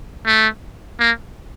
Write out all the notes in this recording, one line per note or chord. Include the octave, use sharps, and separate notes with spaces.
A3
A#3